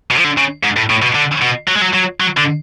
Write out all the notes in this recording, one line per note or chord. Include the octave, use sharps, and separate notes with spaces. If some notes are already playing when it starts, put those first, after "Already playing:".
B2
F3
D3
C#3
G#2
A2
A2
B2
D3
B2
F#3
G#3
F#3
F#3
F#3
D3